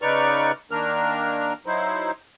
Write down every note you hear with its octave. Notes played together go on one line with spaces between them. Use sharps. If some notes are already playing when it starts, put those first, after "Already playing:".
C#3 D#4 B4 D5 C#6 F6
D#3 A#3 D4 A#4 F6
F#3 D#4 E4 C5